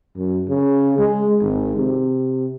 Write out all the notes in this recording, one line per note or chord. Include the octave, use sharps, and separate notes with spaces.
F#2
C#3
G#3
G#1
C3